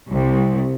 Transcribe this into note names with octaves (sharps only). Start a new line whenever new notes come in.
C2